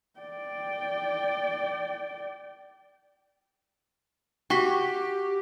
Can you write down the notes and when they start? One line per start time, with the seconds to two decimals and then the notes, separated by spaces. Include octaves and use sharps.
0.20 D5 G5
4.50 F#4 G4 G5 C#6 B6